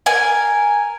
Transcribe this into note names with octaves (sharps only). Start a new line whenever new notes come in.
A#4 G#5